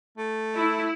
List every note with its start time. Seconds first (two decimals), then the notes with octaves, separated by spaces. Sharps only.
0.18 A3
0.56 E4